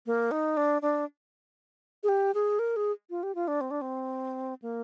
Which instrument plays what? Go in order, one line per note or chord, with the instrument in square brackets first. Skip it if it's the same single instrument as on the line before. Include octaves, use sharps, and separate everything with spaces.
[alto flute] A#3
D#4
D4
D4
G#4
G4
G#4
A#4
G#4
F4
G4
F4
D4
C4
D4
C4
A#3